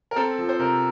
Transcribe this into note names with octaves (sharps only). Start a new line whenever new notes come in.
A#4
C4 A4
F3
C5
C3 A#4